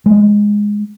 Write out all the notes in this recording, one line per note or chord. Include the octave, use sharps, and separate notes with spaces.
G#3